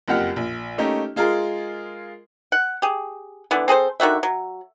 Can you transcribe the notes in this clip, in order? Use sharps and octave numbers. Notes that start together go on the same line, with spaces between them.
F#1 F2 G4 F#5 F6
A#1
A3 A#3 C#4 D#4 G4
G#3 F4 G#4 A#4
F#5
G4 G#4
D3 E3 B3
C4 G#4 A4 C5
D3 D#3 F#4 E5
F#3